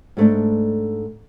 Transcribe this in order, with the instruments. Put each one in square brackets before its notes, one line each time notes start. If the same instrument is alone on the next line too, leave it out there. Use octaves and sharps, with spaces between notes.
[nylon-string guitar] G#2 A3 D4